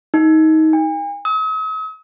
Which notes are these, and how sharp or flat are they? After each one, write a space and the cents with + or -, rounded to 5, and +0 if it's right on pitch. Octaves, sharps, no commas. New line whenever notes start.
D#4 +25
G#5 -45
D#6 +45